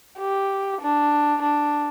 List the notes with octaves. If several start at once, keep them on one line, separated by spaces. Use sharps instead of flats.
G4
D4
D4